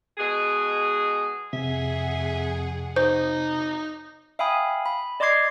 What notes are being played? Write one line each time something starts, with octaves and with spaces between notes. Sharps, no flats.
B2 G#3 G#4
F2 C3 G#4 E5 F#5
D#4 C5
E5 F5 G5 G#5 B5 D#6
B5
D5 D#5 C6 D6 G#6 C7